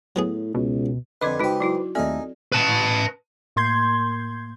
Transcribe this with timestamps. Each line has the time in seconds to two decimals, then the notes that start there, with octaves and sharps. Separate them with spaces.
0.16 A2 F#3 B3 G#4
0.55 C#2 B2
1.21 F2 D3 B4 D#5 C6 D6 G#6
1.39 C#2 D#4 F#4 G4 B4 C5
1.60 F#3 E4 F#4
1.95 D#2 A3 C4 D#4 G#4 A4 D5 E5
2.52 B4 A5
3.56 A2 A#3 C6 G6 G#6